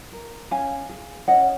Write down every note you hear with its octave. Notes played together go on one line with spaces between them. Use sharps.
A#4
C#4 F5 G#5
G#4
C#4 D#5 F#5